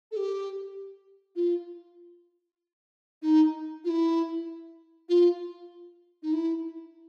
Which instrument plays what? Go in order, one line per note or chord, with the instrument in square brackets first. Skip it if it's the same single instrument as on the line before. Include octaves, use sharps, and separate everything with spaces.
[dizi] A4
G4
F4
D#4
F4
E4
F4
D#4
E4